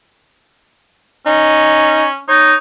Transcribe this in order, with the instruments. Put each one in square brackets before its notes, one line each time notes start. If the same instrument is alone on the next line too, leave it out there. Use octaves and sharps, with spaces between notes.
[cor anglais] C#4 [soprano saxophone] D#4
[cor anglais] D#4 [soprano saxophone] C#5